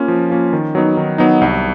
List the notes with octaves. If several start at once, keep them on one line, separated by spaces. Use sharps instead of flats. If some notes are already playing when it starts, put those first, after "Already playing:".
Already playing: A#3 C#4 F4
F3
A#3 C#4 F4
D#3
F#3 B3 D#4
D#3
F#3 B3 D#4
C2